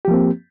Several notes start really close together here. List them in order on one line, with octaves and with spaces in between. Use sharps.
G4 F3 A#3 C4